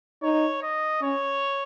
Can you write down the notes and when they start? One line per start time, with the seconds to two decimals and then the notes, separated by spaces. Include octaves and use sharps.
0.23 D#4 C#5
0.62 D#5
1.01 C#4 C#5